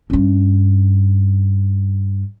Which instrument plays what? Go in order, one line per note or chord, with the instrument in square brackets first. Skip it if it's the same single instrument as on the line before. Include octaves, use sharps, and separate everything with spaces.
[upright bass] G2 C#4